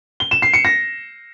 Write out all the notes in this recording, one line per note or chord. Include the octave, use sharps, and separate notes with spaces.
G7
E7
C7
C#7
A#6